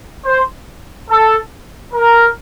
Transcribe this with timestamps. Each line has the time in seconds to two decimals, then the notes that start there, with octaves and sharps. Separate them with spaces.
0.25 C5
1.09 A4
1.94 A#4